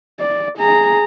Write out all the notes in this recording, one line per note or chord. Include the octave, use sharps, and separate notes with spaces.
D5
G#4 A#5